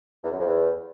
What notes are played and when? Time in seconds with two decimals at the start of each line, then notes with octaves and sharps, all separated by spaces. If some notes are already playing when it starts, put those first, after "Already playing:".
0.23 E2
0.31 F#2
0.39 F2
0.47 E2